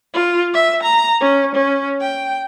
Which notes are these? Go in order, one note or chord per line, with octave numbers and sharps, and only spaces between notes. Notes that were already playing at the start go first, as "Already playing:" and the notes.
F4
E5
A#5
C#4
C#4
G5